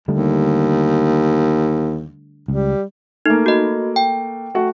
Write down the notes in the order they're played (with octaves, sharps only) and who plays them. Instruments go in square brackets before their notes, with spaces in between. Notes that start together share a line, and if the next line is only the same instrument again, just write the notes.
[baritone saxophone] D#2 [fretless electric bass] D3 G3 A3
[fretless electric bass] C#2 [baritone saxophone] G3
[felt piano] A3 A#3 [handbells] D#4
[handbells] F#4 D#5
G5
[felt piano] A3 F#4